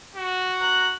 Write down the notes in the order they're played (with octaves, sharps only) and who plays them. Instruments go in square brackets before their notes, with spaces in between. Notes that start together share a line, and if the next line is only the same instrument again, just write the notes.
[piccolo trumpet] F#4
[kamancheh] A#5 F#6